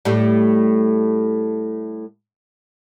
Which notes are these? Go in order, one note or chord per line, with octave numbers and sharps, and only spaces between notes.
A2 G3 A3